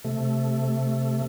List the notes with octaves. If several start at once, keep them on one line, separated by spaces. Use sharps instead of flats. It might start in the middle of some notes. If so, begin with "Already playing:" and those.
C3 A3